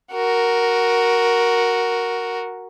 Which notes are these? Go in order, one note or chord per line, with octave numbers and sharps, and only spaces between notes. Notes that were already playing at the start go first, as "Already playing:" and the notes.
F#4 A#4